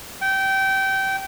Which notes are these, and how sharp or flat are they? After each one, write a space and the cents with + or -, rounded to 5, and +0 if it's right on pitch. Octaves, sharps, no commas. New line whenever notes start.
G5 -20